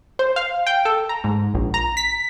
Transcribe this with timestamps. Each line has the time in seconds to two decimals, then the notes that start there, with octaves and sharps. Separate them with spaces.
0.19 C5
0.36 F5
0.67 G5
0.85 A4
1.09 A#5
1.24 G#2
1.54 A#1
1.74 A#5
1.97 B6